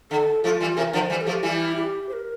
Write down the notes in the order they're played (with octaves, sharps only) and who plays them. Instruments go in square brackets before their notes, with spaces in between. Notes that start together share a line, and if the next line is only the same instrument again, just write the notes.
[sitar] D3 [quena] A4
[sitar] F3 A3 [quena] F4
[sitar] E3 G3
[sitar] C3 E3 [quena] A#4
[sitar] D3 F3
[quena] C5
[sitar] E3 G3
[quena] A4
[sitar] F3 A3 [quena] G4
[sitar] E3 G3 [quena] E4
[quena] G4
C5
A#4